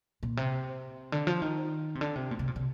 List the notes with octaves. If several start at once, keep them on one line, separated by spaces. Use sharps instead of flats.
A#2
C3
D3
F3
D#3
C3
D3
C3
A#2
C3
A#2
C3